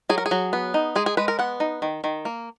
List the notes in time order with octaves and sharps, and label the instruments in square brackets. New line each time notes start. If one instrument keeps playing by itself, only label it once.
[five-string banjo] F#3 G#4
A#4
G#4
F#3
B3
D#4
G#3 G#4
G#4
G#3 B4
A#4
B3 F#5
D#4
D#3
D#3
A#3